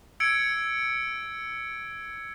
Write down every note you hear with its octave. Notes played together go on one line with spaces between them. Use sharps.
E6 G#6 C#7 D7